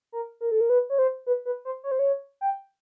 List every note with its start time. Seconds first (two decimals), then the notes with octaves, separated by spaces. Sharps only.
0.12 A#4
0.41 A#4
0.51 A4
0.61 A#4
0.70 B4
0.90 C#5
0.99 C5
1.26 B4
1.45 B4
1.65 C5
1.84 C#5
1.91 C5
1.99 C#5
2.41 G5